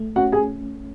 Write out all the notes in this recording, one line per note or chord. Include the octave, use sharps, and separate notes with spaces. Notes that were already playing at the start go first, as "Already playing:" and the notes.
Already playing: A3
C#4 F#4 F#5
G#4 G#5